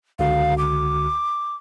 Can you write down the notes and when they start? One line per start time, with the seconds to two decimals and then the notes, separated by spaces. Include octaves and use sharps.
0.19 C#2 D3 F#4 F5
0.58 D6